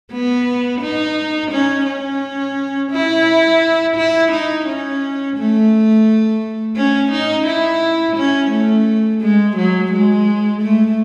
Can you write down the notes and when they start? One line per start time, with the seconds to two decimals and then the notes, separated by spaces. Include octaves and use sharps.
0.12 B3
0.81 D#4
1.51 C#4
1.86 C#4
2.91 E4
3.96 E4
4.31 D#4
4.67 C#4
5.37 A3
6.76 C#4
7.12 D#4
7.46 E4
8.16 C#4
8.51 A3
9.21 G#3
9.56 F#3
9.92 G#3
10.62 A3